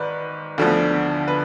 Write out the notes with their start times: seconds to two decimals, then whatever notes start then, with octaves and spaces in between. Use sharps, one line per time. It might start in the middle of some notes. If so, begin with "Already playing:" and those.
Already playing: G#2 D#3 B4 D5
0.58 D2 D3 F3 B3
1.28 B4